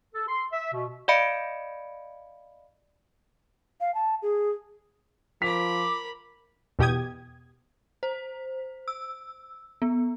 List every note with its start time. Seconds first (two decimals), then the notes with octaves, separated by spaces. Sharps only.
0.15 A4
0.29 C6
0.53 E5
0.73 B2
1.08 D5 D#5 F5 B5 C#7 D7
3.81 F5
3.94 A5
4.22 G#4
5.42 F3 A#4 B5 D6 B6 F7
6.79 E2 B2 G4 G5 D#6 G#6
8.03 C5
8.88 E6
9.82 B3